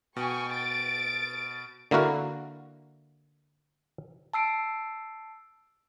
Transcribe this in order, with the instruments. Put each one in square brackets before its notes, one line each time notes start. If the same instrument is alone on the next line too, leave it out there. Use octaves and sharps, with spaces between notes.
[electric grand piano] B2 [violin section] G5 G#5 C#6
[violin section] A6 D7
[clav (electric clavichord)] D3 A#3 E4 F#4 A#4
[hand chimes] A5 E6 C7 D7